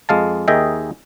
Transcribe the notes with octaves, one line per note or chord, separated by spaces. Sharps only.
F2 G#3 F5 A5
D#2 D#3 G#4 D#5 E5 G5